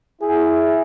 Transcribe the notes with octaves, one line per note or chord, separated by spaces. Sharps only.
E4 G#4